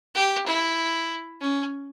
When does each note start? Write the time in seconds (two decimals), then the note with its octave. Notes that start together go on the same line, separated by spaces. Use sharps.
0.15 G4
0.46 E4
1.41 C#4